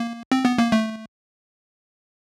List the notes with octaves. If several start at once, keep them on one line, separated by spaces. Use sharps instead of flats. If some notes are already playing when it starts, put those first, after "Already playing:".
Already playing: A#3
C4
B3
A#3
A3